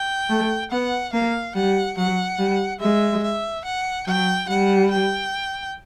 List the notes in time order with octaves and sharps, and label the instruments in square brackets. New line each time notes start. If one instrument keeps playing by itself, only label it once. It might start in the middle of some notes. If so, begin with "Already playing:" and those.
Already playing: [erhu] G5
[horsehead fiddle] A3
[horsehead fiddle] B3 [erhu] F#5
[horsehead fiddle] A#3 [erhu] F5
[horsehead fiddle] G3 [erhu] F#5
[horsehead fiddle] F#3 [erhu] F#5
[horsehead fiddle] G3
[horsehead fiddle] G#3 [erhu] E5
[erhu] E5
F#5
[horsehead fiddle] F#3 [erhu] G5
[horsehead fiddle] G3 [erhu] F#5
[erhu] G5